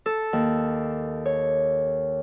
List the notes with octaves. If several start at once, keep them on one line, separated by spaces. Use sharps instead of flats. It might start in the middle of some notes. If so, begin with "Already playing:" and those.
A4
D#2
C#5